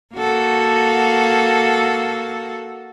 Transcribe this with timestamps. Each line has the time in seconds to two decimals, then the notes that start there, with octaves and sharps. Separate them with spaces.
0.15 A#3 F#4 A4